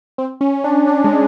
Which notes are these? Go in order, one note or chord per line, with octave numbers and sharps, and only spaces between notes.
C4
C#4
D4
D4
G#3